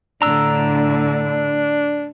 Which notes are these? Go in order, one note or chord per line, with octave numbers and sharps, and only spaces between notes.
A2 D3 D4 A#5 E6